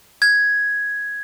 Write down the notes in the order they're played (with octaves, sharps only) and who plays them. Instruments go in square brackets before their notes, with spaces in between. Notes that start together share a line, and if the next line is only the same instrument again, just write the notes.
[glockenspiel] G#6